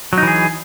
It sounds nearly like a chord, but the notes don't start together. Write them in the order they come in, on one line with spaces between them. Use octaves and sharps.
F#3 D#4 E3 G#4